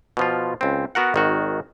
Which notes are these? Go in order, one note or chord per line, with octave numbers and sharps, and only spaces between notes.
B2 F3 F4
C#2 C4
B3 F#4 A#4 F#5
G#1 D#3 F#4